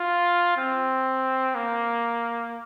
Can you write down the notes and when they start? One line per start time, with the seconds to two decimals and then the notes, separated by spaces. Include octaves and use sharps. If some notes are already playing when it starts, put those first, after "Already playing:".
Already playing: F4
0.57 C4
1.55 A#3